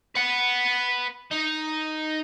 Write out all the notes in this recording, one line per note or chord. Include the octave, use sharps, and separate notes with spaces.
B4 F#5
D#4